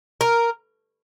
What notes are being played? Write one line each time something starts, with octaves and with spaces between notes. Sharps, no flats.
A#4